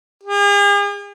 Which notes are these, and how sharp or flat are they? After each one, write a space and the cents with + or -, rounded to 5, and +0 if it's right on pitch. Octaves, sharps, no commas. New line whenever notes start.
G#4 -45